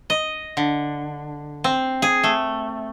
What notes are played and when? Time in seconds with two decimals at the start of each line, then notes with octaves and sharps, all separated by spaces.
0.10 D#5
0.57 D3
1.64 C4
2.02 G#4
2.24 A3